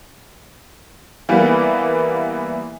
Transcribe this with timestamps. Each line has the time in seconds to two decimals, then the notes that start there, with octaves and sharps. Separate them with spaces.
1.29 E3 G3 A#3 B3